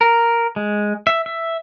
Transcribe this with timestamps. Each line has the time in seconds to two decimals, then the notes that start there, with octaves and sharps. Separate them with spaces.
0.01 A#4
0.56 G#3
1.07 E5
1.26 E5